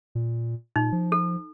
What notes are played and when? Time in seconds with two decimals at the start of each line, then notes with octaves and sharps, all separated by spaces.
0.15 A#2
0.76 A#2 D#4
0.92 F3
1.12 A4